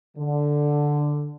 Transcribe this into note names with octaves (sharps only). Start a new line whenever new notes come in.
D3